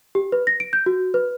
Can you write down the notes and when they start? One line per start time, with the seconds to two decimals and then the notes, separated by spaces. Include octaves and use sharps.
0.15 G4
0.32 B4
0.47 A#6
0.60 D7
0.73 G6
0.86 F#4
1.14 B4